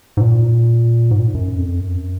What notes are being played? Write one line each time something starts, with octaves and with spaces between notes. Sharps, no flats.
G#2
A#2
G#2
A#2
G#2
F#2
F2
F#2